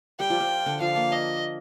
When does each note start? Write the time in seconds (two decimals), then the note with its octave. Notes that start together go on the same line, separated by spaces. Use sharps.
0.19 G3 G4 G5
0.30 F3 F4
0.40 F3 F4
0.66 D3 D4
0.80 F3 F4 F5
0.96 A#3
1.12 D#5